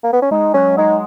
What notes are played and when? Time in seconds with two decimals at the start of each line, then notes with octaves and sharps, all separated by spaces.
0.04 A#3
0.13 B3
0.22 C#4
0.31 G#3 D#4
0.54 F#3 C#4
0.77 G#3 D#4